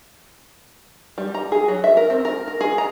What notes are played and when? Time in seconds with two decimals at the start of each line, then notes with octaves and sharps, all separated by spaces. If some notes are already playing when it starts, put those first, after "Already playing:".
1.18 G3
1.34 A#5
1.52 G#4
1.68 F#3
1.84 E5
1.97 A#4
2.10 C4
2.25 A#4
2.47 A#4
2.61 G#4
2.78 A#5